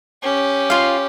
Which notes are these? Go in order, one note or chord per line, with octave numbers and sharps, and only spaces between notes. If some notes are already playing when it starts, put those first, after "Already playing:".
C#4 G4
F4 F5